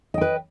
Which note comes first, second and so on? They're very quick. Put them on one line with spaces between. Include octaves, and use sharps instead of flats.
D#5 G5 B4